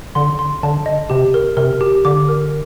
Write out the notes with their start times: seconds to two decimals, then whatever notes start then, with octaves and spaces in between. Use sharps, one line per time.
0.15 D3 C6
0.39 C6
0.63 D3 A5
0.86 D#5
1.10 C3 G4
1.34 A#4
1.57 C3 A#4
1.81 G4
2.05 D3 D6
2.29 A#4